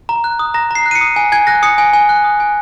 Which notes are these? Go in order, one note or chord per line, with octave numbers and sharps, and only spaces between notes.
A#5
F#6
D#6
A#5 A#6
A#5 C7
F#6
D#7
C#7
D#6
G#5
G#5 G#6
F#6 A#6
D#6 C#7
G#5
G#5
F#6
D#6
G#5